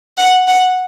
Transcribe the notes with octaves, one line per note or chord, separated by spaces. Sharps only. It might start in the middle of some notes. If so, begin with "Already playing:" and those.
F#5
F#5